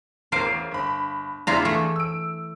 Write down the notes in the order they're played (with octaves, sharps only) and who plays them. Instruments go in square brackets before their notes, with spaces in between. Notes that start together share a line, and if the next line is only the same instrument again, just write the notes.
[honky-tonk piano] A1 E2 D7 [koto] A#4 C5 F5
[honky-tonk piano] G1 B5
[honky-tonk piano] E2 D4 [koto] E4 F4 A#5
[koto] E3 A3
[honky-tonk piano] E6 D7